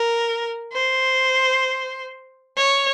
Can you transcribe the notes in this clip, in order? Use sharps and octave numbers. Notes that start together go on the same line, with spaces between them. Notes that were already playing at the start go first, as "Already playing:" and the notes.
Already playing: A#4
C5
C#5